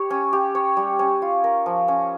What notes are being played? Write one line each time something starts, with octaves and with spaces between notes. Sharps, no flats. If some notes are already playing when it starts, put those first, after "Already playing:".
Already playing: G4 C#5
C#4
G4
C#5
G3
C#4
F4
A#4
F3
C#4